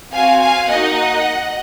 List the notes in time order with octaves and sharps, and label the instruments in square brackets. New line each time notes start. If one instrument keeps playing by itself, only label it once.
[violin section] C4 F#4 F5 G#5
F5 G#5
A#3 D#4 F#4 D#5 F#5